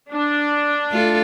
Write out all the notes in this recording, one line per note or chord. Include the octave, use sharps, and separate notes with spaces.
D4
A3 F4 A4